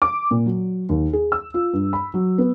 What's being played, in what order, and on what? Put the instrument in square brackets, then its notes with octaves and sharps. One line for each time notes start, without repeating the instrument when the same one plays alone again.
[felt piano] D6
A#2
F#3
D#2
G#4
E6
F4
G2
B5
F#3
B3